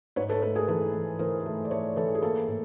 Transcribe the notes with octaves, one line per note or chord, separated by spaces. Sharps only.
G#2 B4 C#5
A4 B4
A3 A4 B4
G#4 A#4
E3 A4 B4
E3
E3 A#4 C5
A3
D5
A3 B4 C#5
E3 A4 B4
G#4
A#3 A4
A2